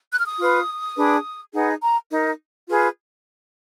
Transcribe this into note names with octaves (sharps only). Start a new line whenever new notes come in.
F#6
F6
D#6
F4 B4
D4 G#4 B4
D#4 G#4 B4 F#5
A#5
D#4 A#4
F4 G#4 B4